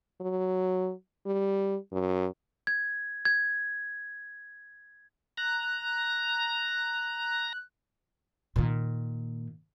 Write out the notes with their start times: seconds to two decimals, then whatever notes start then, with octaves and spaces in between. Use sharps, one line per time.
0.21 F#3
1.26 G3
1.93 F#2
2.67 G#6
3.25 G#6
5.37 A#5 F#6
8.56 A#2 D#3